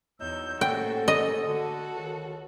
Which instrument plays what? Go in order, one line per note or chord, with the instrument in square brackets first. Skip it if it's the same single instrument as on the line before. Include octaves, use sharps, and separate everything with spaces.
[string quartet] E2 G6 [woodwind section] F#3 D#4 E6
[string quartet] A2 A#3 F#4 [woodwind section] C3 C#4 A4 [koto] G5
[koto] D#5
[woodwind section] D3 [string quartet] F#4 A4
[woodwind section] C#2 D#3